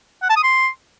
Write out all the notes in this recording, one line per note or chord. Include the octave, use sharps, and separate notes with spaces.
F#5
A5
D#6
C6